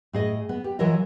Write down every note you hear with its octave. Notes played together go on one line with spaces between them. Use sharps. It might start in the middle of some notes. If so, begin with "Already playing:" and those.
A2 G#4 D#5
B3
G4
E3 F#3 F4 A#4 C#5 D#5